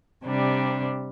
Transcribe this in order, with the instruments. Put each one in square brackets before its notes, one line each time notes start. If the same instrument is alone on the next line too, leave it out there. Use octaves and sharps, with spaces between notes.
[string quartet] C3 G3 D4